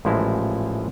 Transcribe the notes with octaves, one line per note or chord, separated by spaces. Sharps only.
A1 A#2 F3 G#3 E4 A#5